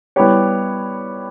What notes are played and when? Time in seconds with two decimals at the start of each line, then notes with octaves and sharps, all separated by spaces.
0.16 G3 B3 E4 G4 C#5